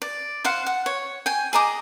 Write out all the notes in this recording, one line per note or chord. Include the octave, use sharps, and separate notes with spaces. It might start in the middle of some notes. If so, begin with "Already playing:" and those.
D5
C5 F5 F#5
F#5
C#5
G5 G#5
G#4 D#5 A#5 D6